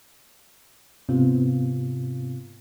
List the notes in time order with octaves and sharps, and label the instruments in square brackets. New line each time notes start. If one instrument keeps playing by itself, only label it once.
[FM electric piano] G#2 C3 B3 C4 F4